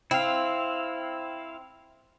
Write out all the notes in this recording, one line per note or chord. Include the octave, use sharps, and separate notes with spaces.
C4 E4 F5